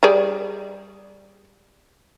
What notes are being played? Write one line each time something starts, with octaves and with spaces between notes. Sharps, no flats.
G3 G#4 D5